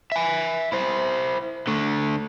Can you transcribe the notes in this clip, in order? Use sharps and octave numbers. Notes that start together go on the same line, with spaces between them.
E5 G#5
E4 C5
D3 A3